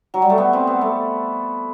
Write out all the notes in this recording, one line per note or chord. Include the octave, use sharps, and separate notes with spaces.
F#3
G3
A3
B3
C4
B3
A3